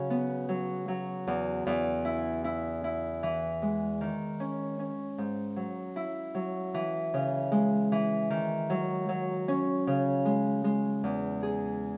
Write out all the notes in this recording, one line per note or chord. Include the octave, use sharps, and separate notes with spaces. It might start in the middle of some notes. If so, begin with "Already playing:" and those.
Already playing: C#3 F#3
B3
F#3
F#3
E2
E2
E4
E4
E4
E3
G#3
D#3
C#4
C#4
G#2
F#3
E4
F#3
E3
C#3
G#3
E3
D#3
F#3
F#3
C#4
C#3
G#3
G#3
E2
G#4